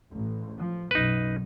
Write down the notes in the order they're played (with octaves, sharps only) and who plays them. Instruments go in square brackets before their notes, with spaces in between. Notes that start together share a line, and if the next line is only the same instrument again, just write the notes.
[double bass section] A1
F3
[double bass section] B1 F#2 B2 [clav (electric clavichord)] D#4 B4